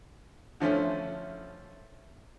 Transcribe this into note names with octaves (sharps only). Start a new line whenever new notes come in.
D3 F3 A3 C#4 E4